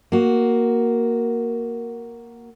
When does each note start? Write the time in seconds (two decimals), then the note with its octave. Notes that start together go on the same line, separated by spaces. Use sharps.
0.12 A#3 F#4